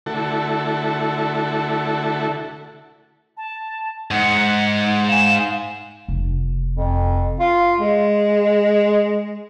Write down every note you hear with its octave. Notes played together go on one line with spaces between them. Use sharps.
D3 A3 E4 F#4 A4
A5
G#2 F#5
F#5
F5 G#5 E7
F1
F2
F4
G#3